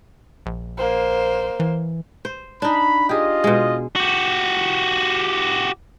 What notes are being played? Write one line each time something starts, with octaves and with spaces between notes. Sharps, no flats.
A#1
A#3 C5
E3
C5
D4 D#4 B5
F4 G4 G#4 D#5
B2 G#3
F#4 G4